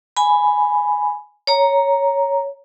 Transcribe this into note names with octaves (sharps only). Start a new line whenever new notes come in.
G#5 B5
C#5 A#5